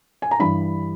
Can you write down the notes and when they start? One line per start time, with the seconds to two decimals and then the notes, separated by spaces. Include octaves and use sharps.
0.22 G#5
0.31 A#5
0.39 G2 E3 G3 B5